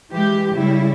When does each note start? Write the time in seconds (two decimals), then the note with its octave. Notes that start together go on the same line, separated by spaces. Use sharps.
0.12 E3 G#3 G4
0.54 C#3 G3 E4